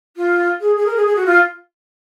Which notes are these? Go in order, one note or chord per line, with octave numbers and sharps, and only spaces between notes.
F4
G#4
G#4
A#4
G#4
G#4
F#4
F4